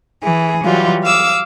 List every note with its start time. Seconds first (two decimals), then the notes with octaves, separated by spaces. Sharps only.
0.22 E3 G#4
0.63 E3 F#3 G3 F4
1.04 F5 D6 E6